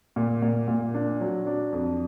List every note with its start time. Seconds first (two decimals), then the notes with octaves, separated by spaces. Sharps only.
0.16 A#2
0.42 A#2
0.68 A#2
0.94 D4
1.21 F#3
1.47 D4
1.72 F2